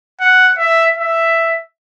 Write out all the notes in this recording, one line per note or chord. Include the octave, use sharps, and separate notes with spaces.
F#5
E5
E5